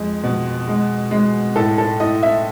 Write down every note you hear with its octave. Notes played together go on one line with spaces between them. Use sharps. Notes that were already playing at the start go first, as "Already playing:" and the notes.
Already playing: F2 G#3
B2
G#3
G#3
A2 A4
A4
A2 D#5
E5